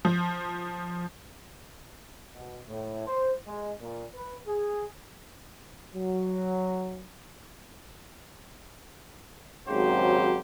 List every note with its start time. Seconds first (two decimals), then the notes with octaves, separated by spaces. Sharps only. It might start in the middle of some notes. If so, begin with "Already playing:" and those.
0.05 F3
2.33 B2
2.68 A2
3.07 C5
3.47 G#3
3.81 A#2
4.14 B4
4.46 G#4
5.95 F#3
9.68 G#1 G#2 C#3 F#3 G4 C5